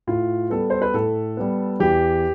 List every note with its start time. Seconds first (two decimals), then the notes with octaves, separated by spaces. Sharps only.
0.07 A2 F4
0.50 G3 B3 A4
0.70 C5
0.82 B4
0.94 A2 A4
1.37 G3 B3
1.80 E2 G4